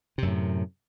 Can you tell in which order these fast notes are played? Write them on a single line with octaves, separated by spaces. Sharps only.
C3 F#2 A2